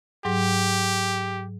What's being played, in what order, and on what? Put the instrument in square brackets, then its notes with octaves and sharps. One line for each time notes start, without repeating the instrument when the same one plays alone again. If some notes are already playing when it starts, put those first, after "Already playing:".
[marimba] G#2 F#3 [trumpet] G4